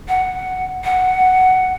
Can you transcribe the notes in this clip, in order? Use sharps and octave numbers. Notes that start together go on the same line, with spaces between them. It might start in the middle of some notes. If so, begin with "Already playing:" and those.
F#5
F#5